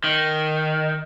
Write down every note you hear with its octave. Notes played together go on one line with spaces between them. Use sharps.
D#3